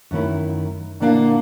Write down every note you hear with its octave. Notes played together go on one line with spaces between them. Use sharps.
F#2 D#3 A3 E4
A#2 D3 A#3 D4 E4 F5